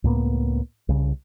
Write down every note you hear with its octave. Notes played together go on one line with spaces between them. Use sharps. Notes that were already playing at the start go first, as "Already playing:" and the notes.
C#2 A2 A#3 B3
C2 C#3